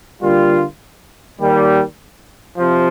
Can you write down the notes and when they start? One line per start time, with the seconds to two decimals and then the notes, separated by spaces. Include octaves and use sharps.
0.22 D3 G3 A#3 F4
1.40 D#2 D#3 G3
2.58 C3 F3